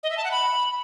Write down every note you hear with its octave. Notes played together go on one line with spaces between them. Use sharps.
D#5
E5
A5
F#5
B5